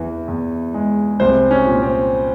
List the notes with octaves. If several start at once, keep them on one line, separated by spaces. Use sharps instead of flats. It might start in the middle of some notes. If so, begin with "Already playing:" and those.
Already playing: E2 E3
E2
G#3
C2 C5
C#4
A#2
C4